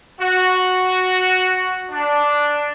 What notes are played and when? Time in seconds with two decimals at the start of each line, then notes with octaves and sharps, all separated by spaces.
0.21 F#4
1.90 D4